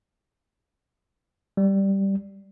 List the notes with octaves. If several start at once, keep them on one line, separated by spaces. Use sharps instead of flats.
G3